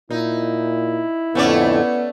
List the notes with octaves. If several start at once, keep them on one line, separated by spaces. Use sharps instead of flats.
A#2 D#4 E4
F2 A2 D3 A3 B3 C#4 D5